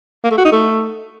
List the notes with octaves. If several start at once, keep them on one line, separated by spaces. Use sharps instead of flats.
A#3
A3
F#4
D#4
A3